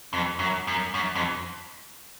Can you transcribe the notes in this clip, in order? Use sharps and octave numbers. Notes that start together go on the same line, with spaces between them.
F2
F#2
F#2
F#2
F2